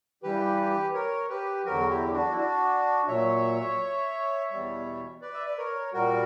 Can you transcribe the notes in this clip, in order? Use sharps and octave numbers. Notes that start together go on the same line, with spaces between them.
G2 E3 G3 G4 B4
A#4 C#5
G4 B4
E2 D3 F#3 F#4 A#4
E4 G4
D4 F#4
E4
D4 F#4
A#2 F#3 C#5 E5
E2 B2 G3
B4 D5
E5
D5
A#4 C#5
A#2 G3 F#4 A#4